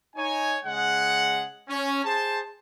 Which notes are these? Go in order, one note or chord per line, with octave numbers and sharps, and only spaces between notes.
D#4 C#5 G#5
C#3 G#3 G#4 F#5
C#4
G#4 C5 A5